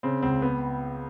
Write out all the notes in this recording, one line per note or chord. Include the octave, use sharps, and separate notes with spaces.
C#3 C4
C#2 C4
B3